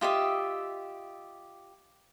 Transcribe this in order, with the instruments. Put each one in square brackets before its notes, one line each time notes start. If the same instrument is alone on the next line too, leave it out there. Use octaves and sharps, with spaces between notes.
[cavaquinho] F4 G4 D#5 E5